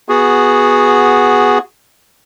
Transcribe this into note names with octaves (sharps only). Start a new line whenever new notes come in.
B3 F#4 G#4